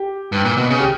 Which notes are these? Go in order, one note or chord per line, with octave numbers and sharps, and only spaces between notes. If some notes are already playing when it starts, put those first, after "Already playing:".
Already playing: G4
G2
A#2
B2
C#3
G4